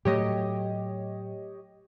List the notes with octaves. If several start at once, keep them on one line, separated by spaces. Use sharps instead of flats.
A2 F#3 A3 G4 C#5 D#5